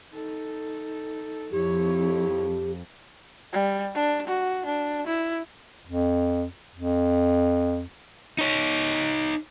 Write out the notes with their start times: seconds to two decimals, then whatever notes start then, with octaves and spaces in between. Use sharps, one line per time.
0.13 D#4 A4
1.52 F2 E4 G4 C#5
3.52 G3
3.95 D4
4.27 F#4
4.66 D4
5.07 E4
5.87 F2
6.75 F2
8.38 D#4 C#5